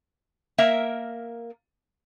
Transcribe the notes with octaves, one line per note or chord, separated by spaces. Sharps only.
A#3 A#4 E5